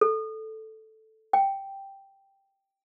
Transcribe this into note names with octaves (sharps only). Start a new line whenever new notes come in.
A4
G5